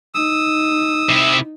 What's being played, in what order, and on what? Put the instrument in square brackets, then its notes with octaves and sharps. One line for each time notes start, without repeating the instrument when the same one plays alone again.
[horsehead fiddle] D#4 [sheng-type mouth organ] D#6 E6
[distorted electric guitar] C3 E4